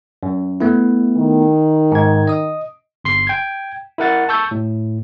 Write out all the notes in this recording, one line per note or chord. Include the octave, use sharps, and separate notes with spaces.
F#2
A3 B3 E4
D#3
G#2 G#6
D#5 D#6
G1 C6 C7
G5 G#6
E4 A#4 F#5 A6
A5 C#6 E6 G6
A2